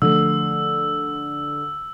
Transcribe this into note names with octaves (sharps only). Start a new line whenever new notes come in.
D3 F3 A3 E6